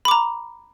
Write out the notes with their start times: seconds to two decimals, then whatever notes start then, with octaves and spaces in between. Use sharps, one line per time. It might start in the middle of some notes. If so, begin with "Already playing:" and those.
0.05 B5
0.08 D6
0.11 A#5